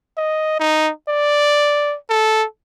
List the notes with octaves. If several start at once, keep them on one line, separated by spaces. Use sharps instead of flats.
D#5
D#4
D5
A4